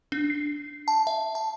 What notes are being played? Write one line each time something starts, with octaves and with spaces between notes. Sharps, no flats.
D4
C7
A5
E5
A5